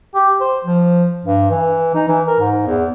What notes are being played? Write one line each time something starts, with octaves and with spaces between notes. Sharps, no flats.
G4
C5
F3
G2
E3
D#4
E3
A#4
G#2
E2